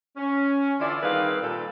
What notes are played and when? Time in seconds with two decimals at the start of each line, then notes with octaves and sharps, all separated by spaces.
0.17 C#4
0.79 D3 E3 E4 F4 D5
1.02 D#3 G3 C4 G#4 B4 F5
1.42 A#2 G3 A4